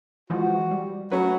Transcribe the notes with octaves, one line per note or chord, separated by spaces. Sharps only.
E3 F3 G#3 F#4
G3
F#3 A3 C#4 B4